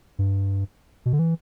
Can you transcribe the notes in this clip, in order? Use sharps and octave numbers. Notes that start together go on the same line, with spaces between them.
G2
B2
D3
E3